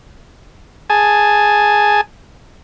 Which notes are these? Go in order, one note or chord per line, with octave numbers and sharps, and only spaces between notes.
G#4 G#5 A5